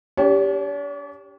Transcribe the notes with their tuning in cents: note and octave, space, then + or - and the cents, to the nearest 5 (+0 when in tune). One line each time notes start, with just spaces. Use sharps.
D4 -45 G4 +5 C#5 +0